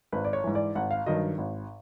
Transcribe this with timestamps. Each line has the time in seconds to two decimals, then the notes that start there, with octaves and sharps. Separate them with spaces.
0.12 G#1 B4
0.25 D5
0.33 C#5
0.44 G#2 E3
0.55 D5
0.75 G#1 F#5
0.91 F5
1.06 G2 D#3 F#3 D#5
1.38 G#1